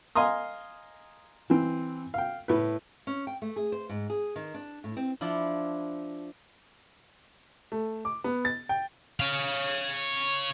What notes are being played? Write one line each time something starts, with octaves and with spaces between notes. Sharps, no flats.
D#5 F5 G#5 A#5 C6 D#6
E3 C4
F5 G5
A2 B4
C#4
G5
A3
G#4
C5
G#2
G#4
D#3
D4
A2
C4
F3 D4 E4
A3
D6
B3
A6
G5
C#5 F5